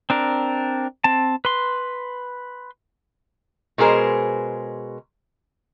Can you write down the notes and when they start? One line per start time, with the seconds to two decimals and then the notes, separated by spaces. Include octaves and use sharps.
0.10 C4 D4 A#4
1.04 C4 A5
1.45 B4 C6
3.78 B2 G#3 G#4 A#4 C5